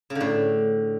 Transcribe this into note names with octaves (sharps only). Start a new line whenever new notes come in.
C#3
D3
A2